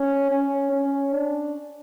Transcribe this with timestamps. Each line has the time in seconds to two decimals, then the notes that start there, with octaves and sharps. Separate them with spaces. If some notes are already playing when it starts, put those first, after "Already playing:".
Already playing: C#4
0.31 C#4
0.73 C#4
1.13 D4